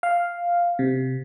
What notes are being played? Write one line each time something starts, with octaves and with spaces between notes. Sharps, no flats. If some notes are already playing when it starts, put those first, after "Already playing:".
F5
C3